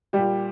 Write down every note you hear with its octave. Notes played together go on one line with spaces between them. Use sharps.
A#2 G3 G4